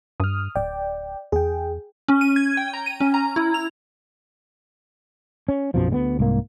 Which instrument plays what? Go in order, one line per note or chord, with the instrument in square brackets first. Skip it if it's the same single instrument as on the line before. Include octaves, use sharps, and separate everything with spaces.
[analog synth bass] G2 [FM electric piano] D#6 F6
[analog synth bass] D1 [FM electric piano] D5 G5
[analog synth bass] E2 [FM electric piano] G#4 G5
[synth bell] C#4
D#7
G#6
G5
A#5
D#7
C#4
A#5
E4
F7
[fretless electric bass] C#4
B1 F#2 B2 F3
D2 G3 B3
C2 G#2 A#3